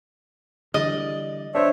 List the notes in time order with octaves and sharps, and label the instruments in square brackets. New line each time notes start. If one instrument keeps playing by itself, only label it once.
[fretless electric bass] D3 E3 G3 [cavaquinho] D5 D#5
[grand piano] D4 C5 [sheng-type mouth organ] C#5 E5